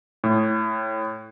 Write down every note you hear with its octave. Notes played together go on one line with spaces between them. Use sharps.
A2